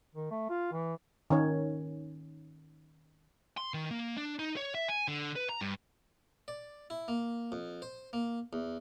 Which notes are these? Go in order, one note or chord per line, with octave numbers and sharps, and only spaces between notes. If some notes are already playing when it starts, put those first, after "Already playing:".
D#3
A3
F4
E3
D#3 C#4 C#5
C6
D#3
A#3
D4
D#4
C#5
E5
G#5
D3
B4
A#5
G2
D5
E4
A#3
F2
C5
A#3
E2